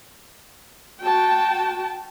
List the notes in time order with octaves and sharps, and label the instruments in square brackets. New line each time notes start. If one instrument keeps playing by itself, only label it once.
[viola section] F#4 G5 A5